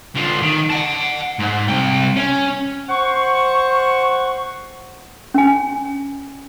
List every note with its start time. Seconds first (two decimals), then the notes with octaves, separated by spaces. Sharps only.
0.16 D3 F4
0.42 D#3
0.70 F#5 A5
1.39 G#2
1.68 C2 G5
2.16 C#4
2.89 C5 F#5 C#6
5.34 C#4 G#5